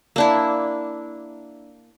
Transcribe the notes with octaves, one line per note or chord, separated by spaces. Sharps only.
A#3 D4 E4